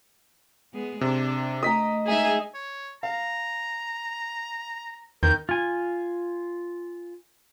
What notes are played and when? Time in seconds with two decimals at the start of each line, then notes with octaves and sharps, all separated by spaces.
0.73 G#3 B3 G#4
1.01 C3 D4
1.63 A3 D#5 A#5 D#6 B6
2.06 G#3 D#4 G#4 E5
2.54 C#5
3.03 F5 A#5
5.23 E2 D#3 A#4 G6
5.49 F4 G#5